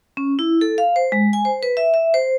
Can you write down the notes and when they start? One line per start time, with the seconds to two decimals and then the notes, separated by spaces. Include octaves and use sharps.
0.17 C#4
0.39 E4
0.61 A4
0.78 F5
0.96 C5
1.12 G#3
1.33 G#5
1.45 C5
1.63 B4
1.77 E5
1.94 E5
2.14 C5